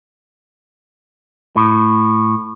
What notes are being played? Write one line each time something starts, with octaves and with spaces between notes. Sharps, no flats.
A2